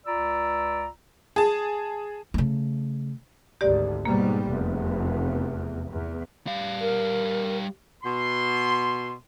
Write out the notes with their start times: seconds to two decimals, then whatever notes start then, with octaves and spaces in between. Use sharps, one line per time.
0.06 C#2 F4 D5 A#5 B5 E6
1.36 G#4 A5
2.34 C#3 A3
3.61 G#1 D2 G4 D5
4.05 G#2 B2 G3 A#3
4.48 F1 E2
5.91 E2
6.47 G3 F5
6.81 A#4
8.03 B2 C6